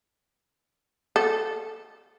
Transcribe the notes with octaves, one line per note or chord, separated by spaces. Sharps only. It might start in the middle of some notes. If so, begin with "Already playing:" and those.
A4